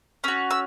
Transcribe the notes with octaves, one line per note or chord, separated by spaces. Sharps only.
C#4 F#4 E6
E6